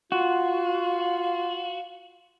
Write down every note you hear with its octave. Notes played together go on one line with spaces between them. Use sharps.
F4 F#4 F5